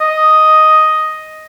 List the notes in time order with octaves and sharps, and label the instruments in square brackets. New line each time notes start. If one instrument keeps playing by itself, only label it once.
[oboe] D#5